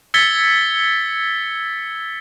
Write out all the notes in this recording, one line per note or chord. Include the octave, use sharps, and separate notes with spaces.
E6 G#6 A6 B6 C#7 G7